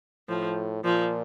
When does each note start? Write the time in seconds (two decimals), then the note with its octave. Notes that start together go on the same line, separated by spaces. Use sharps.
0.29 A2 F3
0.84 A#2 F3